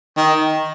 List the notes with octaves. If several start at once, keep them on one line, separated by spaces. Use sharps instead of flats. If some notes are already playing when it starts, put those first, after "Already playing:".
D#3